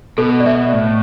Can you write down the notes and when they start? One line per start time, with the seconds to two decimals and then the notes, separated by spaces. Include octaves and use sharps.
0.18 B2 A4
0.40 D5
0.46 B2 E5
0.73 A2